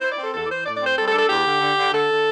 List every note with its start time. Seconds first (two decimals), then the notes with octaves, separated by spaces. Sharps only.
0.01 E4 C5
0.12 D5
0.17 C4
0.23 A4
0.33 E2 A4
0.44 D5
0.49 E3 C5
0.65 A2 D5
0.76 C4 D5
0.86 C5
0.97 G3 A4
1.08 A4
1.13 D4
1.18 A4
1.29 E2 G4
1.45 D3
1.61 D3
1.77 D3
1.93 D3 A4
2.09 D3